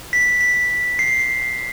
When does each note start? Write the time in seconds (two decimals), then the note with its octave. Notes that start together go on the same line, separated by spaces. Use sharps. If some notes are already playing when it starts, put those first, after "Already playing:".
0.13 B6
0.41 B6
0.99 C7